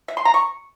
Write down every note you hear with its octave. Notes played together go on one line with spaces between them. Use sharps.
E5
C6
A#5
C#6